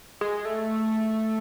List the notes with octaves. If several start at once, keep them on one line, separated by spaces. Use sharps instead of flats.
G#3
A3